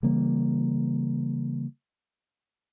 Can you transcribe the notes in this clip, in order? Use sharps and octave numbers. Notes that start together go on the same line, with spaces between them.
C#3 E3 G3 A#3